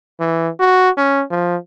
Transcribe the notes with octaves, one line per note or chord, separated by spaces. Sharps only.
E3
F#4
C#4
F3